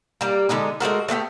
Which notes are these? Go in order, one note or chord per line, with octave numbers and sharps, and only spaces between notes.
G3 A#3
D3 G#3 B3 D#4
G#3 A3 F#4 A#4
A3 B3 F4 G4